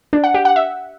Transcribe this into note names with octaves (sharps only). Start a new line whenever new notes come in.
D4
F#5
G4
F#5
E5